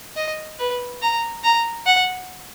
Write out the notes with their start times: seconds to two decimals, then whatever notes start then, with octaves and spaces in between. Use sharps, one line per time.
0.17 D#5
0.59 B4
1.02 A#5
1.44 A#5
1.86 F#5